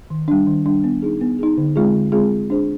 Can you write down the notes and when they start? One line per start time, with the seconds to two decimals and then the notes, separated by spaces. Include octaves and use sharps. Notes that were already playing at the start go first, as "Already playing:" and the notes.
0.10 D#3
0.28 G3 D4
0.47 D#3
0.66 G3 D4
0.84 B3
1.02 D#4 G#4
1.21 B3
1.39 D#4 G#4
1.58 D3
1.76 G#3 C4 F4 G#4
1.94 D3
2.12 G#3 C4 F4 G#4
2.31 G#3
2.50 D4 G#4 C5